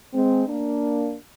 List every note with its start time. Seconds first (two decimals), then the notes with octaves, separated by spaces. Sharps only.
0.14 G#3 C4
0.47 A#3 D4